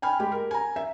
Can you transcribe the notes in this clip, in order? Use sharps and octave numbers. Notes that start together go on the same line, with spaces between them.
G5 G#5 B5 F6
G#3 G4
A#4
G#5 A#5
E5